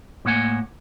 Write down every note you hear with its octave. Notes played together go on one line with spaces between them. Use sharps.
A2 A#3 F#5 G#5